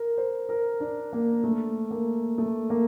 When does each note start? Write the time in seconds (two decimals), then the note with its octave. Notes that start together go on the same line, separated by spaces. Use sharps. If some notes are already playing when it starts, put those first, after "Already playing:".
Already playing: A#4
0.18 C5
0.49 A#4
0.80 D4
1.13 A#3
1.44 A3
1.91 A#3
2.38 A3
2.70 A#3